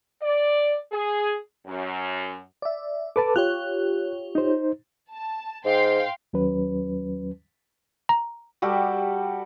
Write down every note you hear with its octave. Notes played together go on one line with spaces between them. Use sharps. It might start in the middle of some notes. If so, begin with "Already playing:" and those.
D5
G#4
F#2
D5 E5
A4 B4 A5 D6
F4 G4 C#5 F#6
D#4 C5
A5
G#2 F5 G5 C6
D#2 F#3 C#4 B4
A#5
G3 F#4 G4 A4